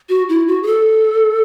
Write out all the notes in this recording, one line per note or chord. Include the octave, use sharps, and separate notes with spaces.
F#4
E4
F#4
G#4
A4